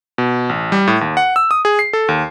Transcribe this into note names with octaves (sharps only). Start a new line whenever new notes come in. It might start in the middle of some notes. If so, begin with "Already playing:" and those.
B2
A1
G3
A2
D#2
F#5
E6
D#6
G#4
C7
A4
D#2